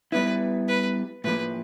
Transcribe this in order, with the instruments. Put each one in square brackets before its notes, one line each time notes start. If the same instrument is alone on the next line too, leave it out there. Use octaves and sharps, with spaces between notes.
[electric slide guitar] G3 B3 E4 [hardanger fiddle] B4
[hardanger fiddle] B4
[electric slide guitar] A2 F3 A#3 [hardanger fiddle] B4